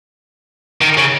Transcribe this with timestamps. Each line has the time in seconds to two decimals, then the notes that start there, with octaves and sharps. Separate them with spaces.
0.81 D#3
0.98 C#3